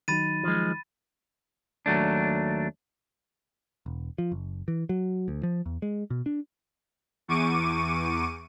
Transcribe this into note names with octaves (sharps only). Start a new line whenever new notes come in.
D#3 F#3 D#4 B5 A6 D#7
F3 G#3
D#2 F#3 A3 D4
E1
F3
F#1
E3
F#3
D2
F3
E2
G#3
B2
D4
E2 C#6 D6 D#7